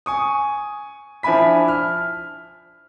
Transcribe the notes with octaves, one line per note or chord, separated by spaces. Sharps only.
G#5 C#6 D#6
F3 D4 E4 G#5 B5 B6
F6